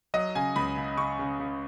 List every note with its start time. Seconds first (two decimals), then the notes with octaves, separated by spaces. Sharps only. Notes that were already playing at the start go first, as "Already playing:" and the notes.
0.14 F#3 D#5
0.35 C#3 G#5
0.56 C#2 B5
0.77 C#3
0.98 C#3 C#6
1.19 C#3
1.40 C#3